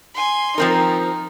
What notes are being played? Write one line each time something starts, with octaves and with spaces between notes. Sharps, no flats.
G#5 C6
F3 C4 D#4 A#4